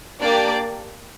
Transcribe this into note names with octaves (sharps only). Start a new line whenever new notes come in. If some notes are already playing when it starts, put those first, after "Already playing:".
A#3 D4 G4 D5